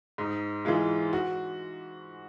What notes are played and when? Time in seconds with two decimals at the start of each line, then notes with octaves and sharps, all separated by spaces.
0.18 G#2 D#4
0.65 E3 G#3 F4
1.13 F#4